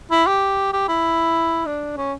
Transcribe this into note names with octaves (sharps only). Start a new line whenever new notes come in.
E4
G4
G4
E4
D4
C#4